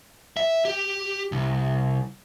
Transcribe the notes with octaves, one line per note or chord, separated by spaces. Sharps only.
E5
G4
C2